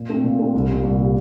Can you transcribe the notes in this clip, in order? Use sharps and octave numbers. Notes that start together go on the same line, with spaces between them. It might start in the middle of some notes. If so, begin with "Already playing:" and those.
Already playing: A#2
A3 C4
A#2
A3 C4
C2
A#2 G3
C2
A#2 G3